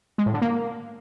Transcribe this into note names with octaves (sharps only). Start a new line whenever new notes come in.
G#3
A2
D3
A#3